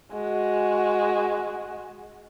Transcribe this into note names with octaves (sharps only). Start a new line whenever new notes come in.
G#3 F#4